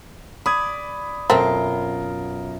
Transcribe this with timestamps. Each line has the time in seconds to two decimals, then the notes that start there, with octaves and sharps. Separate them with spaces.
0.46 D5 B5 D#6 G#6
1.30 F#2 B2 A3 C4 F4 A#4